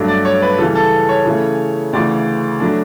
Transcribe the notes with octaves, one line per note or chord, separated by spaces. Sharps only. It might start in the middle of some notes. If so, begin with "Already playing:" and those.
Already playing: G2 F#3 A3 D4
D5
C#5
B4
C#3 E3 G3 A4
A4
C#5
C#3 E3 A3 C#4
D2 C#3 E3 D5
F#3 A3 D4